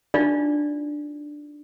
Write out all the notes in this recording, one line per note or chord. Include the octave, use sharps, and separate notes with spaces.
D4 D#4 F4 D5